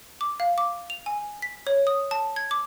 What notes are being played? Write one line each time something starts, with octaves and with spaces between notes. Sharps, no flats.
D6
F5
D6
F7
G#5
B6
C#5
D#6
A5
G#6
D6